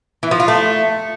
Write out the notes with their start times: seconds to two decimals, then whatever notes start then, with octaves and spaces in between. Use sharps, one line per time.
0.23 E3
0.31 F3
0.40 F4
0.48 A3